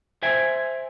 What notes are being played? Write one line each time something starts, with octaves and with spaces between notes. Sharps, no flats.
C5 E5 G5 G#5